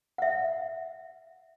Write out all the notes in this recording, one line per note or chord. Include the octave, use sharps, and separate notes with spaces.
E5 F#5